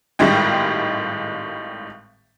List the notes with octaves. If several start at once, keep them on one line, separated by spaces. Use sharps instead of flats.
G#1 A2 D#3 G3 G#3 G5